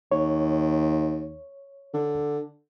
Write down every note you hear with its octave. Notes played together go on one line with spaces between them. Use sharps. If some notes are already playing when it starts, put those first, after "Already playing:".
D#2 C#5
D3